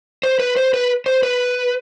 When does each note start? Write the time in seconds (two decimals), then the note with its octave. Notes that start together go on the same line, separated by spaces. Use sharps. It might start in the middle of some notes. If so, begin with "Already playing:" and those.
0.23 C5
0.39 B4
0.56 C5
0.74 B4
1.06 C5
1.23 B4